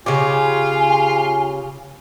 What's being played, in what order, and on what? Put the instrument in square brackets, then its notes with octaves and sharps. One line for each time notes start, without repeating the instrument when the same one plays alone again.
[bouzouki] C#3 G4 [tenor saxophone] F4 [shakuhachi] G#5